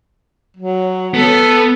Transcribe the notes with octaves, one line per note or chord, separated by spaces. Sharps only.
F#3
B3 A4